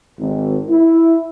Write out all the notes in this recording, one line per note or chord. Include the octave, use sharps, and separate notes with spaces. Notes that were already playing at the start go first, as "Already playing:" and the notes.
G#1
E4